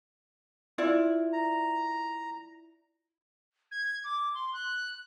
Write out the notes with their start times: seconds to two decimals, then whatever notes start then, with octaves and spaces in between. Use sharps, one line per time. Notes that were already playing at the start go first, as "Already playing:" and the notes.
0.78 E4 F4 D5
1.33 A#5
3.71 G#6
4.04 D6
4.34 C6
4.54 F#6